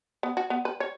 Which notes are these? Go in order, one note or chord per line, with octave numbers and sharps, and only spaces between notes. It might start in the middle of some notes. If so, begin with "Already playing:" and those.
B3
F#4
B3
B4
C#5